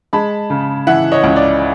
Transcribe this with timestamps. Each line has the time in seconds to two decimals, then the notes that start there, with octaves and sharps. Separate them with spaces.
0.13 G#3 A5 B5
0.50 C#3
0.87 E3 E5 F#5
1.12 C#5 D#5
1.24 C#2
1.36 D5